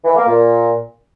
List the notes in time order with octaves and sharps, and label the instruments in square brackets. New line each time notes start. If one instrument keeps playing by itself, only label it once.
[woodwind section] E3
A#3
A#2